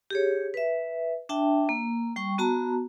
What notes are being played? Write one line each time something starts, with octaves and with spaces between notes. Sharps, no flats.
G4 G#4 C#5
B4 E5
D4 E5 G5 A5
A#3
G3 G5 C#6
B3 F#4 A5 A#5